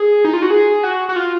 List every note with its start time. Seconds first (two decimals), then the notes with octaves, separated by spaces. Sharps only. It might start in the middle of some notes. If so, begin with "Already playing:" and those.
Already playing: G#4
0.25 D#4
0.33 F4
0.42 F#4
0.50 G#4
0.83 F#4
1.09 F#4
1.16 F4